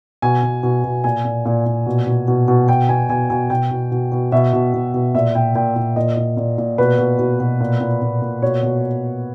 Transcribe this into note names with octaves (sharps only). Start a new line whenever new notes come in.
B2 G#5
B2
B2
B2
A#2 G#5
A#2
A#2
A#2
B2
B2
B2
B2
B2 G5
B2 G#5
B2 G#5
B2 G#5
B2 G5
B2
B2
B2
B2 E5
B2
B2
B2
A#2 E5
A#2 G5
A#2 G5
A#2
A#2 D#5
A#2
A#2
A#2
B2 B4
B2
B2
B2
A#2
A#2
A#2
A#2
B2 C#5
B2